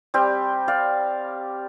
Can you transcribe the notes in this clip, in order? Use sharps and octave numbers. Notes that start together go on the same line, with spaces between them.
G3 C4 G4
D5 F5